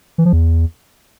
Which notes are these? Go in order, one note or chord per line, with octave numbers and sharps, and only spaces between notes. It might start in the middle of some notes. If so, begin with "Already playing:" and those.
E3
F3
E2